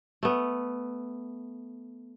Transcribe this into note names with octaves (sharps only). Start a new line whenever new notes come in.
A3 B3